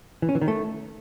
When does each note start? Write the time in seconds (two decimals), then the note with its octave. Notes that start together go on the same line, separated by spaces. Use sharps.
0.22 E3
0.29 C#4
0.35 E3
0.41 D#3
0.48 A3